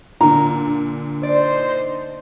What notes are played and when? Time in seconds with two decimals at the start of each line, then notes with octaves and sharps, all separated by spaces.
0.21 A#2 D3 A#5
1.23 D4 D#4 C5 D5